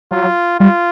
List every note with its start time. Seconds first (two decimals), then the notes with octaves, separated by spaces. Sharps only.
0.11 F#3 F4
0.60 G3 F4